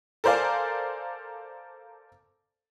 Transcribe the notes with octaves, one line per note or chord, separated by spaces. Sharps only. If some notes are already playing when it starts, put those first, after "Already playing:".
A4 A#4 C5 D5 F5 G#5